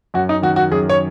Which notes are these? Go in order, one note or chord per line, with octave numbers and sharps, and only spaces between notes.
F#2 F#4
D#4
D#3 F#4
F#4
F#2 G#4
C#5